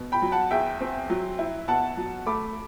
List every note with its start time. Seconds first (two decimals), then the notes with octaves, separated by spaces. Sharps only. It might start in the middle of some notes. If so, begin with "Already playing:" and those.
Already playing: B2
0.12 G5 B5
0.22 F#3
0.32 F#5 A5
0.51 E2 E5 G5
0.81 C4
1.10 F#3
1.39 E4
1.68 B2 F#5 A5
1.97 F#3
2.26 A3 B5 D6